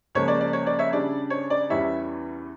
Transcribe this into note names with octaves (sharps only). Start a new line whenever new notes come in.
C#2 C#3 F3 A#3 C#5
D5
D5
C#5
D5
C#5 E5
C#3 G3 D4 D5
C#5
D5
E2 E3 G3 C#4 C#5 E5